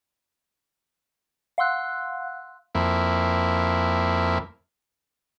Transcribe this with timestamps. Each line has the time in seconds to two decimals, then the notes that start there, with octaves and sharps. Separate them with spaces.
1.58 F5 F#5 C6 E6 F#6
2.75 F2 A#3 E4